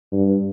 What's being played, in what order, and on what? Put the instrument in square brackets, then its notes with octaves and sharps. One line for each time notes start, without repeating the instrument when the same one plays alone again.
[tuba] G2